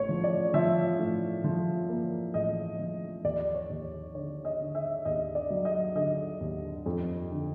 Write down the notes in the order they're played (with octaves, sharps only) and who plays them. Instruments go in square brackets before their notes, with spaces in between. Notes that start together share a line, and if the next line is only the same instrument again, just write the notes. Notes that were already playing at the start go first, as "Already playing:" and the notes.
Already playing: [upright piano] A1 C#5
F3
D5
F3 E5
A2
F3
A#3
A1 D#5
F3
D#2 D5
C#5
D#2
D3 C#5
D#5
D3
E5
D#2 D#5
D5
F#3
D#5
D3 D#5
D#2
F2
D3